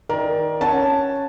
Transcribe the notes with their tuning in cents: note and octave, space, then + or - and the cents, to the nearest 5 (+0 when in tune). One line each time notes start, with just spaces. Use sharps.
D#3 +10 A#4 +20 D5 +0
C#4 +0 F#5 +0 A5 +0